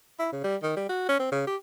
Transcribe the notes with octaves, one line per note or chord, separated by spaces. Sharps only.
E4
C#3
G3
D#3
G3
F#4
C#4
C4
C#3
G4